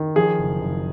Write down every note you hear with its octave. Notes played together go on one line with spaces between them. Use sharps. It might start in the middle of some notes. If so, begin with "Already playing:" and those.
Already playing: D#3
F3 G#4
F#1
F#1